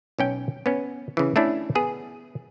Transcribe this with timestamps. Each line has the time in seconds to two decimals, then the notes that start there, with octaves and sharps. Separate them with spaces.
0.19 B1 C#4 G5
0.66 B3 C#4
1.17 C#3 E3
1.36 A3 C#4 D4 E4
1.75 B3 G#4